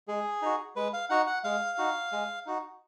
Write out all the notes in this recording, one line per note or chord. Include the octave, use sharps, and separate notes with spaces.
G#3 G#4
D#4 F#4
G#3 B4
F5
D#4 F#4 F#5
F#5
G#3 F5
D#4 F#4
G#3
D#4 F#4